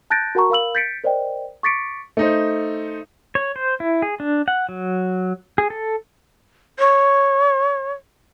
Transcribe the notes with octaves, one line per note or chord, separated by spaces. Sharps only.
A5 F#6 G6 A6 A#6 D7
F#4 A#4 F#5 A5 A#5 C#6
A#4 F5 B5 E6 F#7
G6 A6 B6 C#7 D7
A#4 C5 D5 D#5 G5
C#6 D6 A6 B6 C#7 D7
A3 D#4 C5
C#5
C5
E4
G#4
D4
F#5
F#3
G#4
A4
C#5